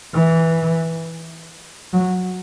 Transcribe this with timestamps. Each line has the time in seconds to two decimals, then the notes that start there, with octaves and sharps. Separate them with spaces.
0.13 E3
1.93 F#3